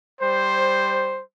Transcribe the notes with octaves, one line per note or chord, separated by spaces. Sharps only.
G3 C5